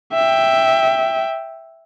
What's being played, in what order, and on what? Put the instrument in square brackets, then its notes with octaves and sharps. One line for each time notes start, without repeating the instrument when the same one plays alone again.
[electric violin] E5 G5